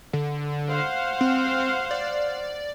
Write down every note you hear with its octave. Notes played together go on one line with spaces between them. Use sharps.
D3
C5 F5 F#5
C4
D5